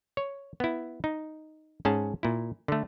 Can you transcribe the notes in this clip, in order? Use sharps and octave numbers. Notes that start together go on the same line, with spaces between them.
C#5
B3 E4
D#4
G#2 C#4 G#4 A5
A#2 E4
D3 A3